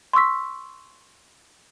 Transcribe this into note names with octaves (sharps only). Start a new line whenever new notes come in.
C6 C#6 E6 B6